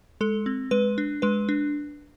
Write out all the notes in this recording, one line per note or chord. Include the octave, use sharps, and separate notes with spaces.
G#3 A4
C4
G#3 B4
D4
G#3 B4
D4